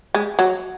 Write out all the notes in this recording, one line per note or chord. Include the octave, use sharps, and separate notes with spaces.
G#3
F#3